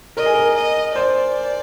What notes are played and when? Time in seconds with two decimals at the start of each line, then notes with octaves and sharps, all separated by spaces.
0.17 A#4 D#5
0.26 G#4
0.34 A#4
0.55 D#5
0.95 C5 D5